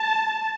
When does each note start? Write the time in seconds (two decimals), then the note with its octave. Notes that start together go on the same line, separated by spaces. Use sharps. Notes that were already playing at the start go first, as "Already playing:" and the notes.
Already playing: A5